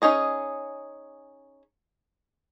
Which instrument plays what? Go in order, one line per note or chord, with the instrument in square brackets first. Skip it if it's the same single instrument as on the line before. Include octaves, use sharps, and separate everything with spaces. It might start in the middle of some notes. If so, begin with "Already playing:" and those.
[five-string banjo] C#4 D#4 G#4 D#5